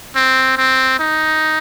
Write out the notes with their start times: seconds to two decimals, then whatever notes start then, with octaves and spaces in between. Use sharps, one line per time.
0.16 C4
0.57 C4
0.99 D#4